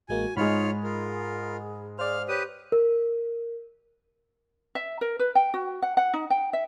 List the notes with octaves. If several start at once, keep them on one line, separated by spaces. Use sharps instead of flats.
A1 G#3 A#3 F#4 G#5
G#2 G#3 D#4 F4 C#5 B5 F6
F4 G#4 A#4
G#4 C5 D5 F5 F6
G4 B4 C#5 D#6
A#4
E5
A#4
B4
G5
F#4
F#5
F#5
D#4
G5
E5